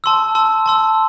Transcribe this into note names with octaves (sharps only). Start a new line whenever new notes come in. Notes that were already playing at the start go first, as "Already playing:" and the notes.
A5 C6 E6
A5 C6 E6
A5 C6 E6